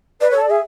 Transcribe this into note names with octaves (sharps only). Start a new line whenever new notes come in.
B4 D5
A4 C#5
D5
G#4 E5